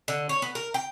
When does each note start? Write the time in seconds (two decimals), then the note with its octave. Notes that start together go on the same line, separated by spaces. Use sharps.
0.08 D3
0.29 C#5
0.42 B3
0.55 A#4
0.74 G5